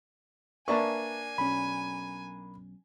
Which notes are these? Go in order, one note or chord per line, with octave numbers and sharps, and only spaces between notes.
A#3 D4 B4 E5 G#5 A5 C#6
B1 C#4 B5